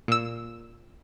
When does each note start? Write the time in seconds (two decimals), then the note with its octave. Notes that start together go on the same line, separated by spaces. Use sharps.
0.08 A#2 E6